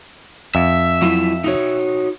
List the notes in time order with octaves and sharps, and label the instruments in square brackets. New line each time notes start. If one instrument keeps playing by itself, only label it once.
[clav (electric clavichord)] F2 [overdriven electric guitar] E5
[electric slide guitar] F#3 E4 F4
D#4 F#4 C#5